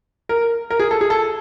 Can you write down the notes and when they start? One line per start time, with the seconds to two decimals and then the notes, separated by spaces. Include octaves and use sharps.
0.29 A#4
0.70 A#4
0.80 G#4
0.91 A4
1.01 G#4
1.10 A4